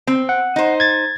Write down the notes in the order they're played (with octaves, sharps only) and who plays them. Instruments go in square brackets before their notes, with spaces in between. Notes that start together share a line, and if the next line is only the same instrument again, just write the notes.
[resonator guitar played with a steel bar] C4
[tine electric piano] F#5
[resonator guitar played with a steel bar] D#4 C5
[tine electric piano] G#6 A6